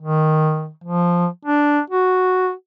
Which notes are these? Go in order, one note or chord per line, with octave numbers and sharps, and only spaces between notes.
D#3
F3
D4
F#4